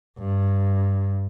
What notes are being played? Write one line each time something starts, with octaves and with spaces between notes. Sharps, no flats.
G2